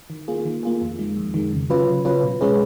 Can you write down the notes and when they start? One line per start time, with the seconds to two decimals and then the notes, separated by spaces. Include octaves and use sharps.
0.10 D#3
0.28 A#3 F4 G#4
0.45 D#3
0.63 A#3 F4 G#4
0.82 F2
0.99 D#3 G#3
1.17 F2
1.34 D#3 G#3
1.52 C#3
1.70 F#3 C#4 F4 B4
1.88 C#3
2.05 F#3 C#4 F4 B4
2.23 B2
2.41 G#3 C#4 G#4 B4